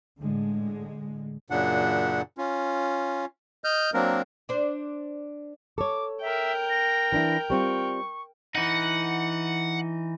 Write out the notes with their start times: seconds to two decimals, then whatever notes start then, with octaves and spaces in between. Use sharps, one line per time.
0.20 A2 D3 G#3
1.50 F#2 A#2 C#3 D4 F#5
2.38 C#4 F4
3.64 D#5 F6 G6
3.94 F#3 A#3 C4 D4 A#4
4.49 D4 C5
5.78 A4 C#5 D6
6.21 A#4 E5 G5
6.69 A#6
7.12 E3 D4 E4
7.50 G3 C4 F4 C#6
8.55 E3 D#4 F#5